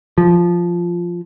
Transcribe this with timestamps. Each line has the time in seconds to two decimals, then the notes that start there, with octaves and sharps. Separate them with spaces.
0.18 F3